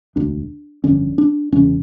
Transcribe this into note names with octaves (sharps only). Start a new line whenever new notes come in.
E1 D2 D3 D4
G1 F2 D3 C#4
D4
E1 E2 C#3 C#4